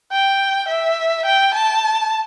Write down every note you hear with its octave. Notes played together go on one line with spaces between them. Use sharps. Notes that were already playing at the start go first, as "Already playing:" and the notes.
G5
E5
G5
A5